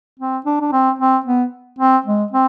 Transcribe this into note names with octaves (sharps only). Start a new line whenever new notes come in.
C4
D4
D4
C4
C4
B3
C4
G#3
C4